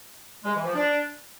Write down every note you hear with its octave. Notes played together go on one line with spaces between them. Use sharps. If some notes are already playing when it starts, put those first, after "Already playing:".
G#3
E3
F3
D4